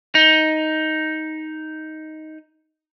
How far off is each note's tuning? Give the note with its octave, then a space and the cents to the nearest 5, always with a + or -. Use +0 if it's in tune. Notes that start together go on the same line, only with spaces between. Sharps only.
D#4 +5